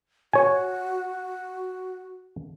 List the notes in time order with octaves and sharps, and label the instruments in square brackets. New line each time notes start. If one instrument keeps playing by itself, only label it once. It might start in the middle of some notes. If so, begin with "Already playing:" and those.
[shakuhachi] F#4 [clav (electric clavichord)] C#5 G#5